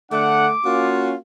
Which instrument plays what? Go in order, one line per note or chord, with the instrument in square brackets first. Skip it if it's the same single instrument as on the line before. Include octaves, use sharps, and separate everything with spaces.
[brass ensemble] D3 D4 F#5 [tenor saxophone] A3 [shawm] D6
[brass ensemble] A#3 C#4 F4 [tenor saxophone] F#4